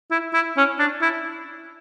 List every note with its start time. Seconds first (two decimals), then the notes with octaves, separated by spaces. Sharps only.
0.11 E4
0.34 E4
0.57 C#4
0.79 D4
1.02 E4